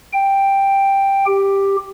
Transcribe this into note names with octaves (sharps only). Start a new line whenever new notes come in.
G5
G4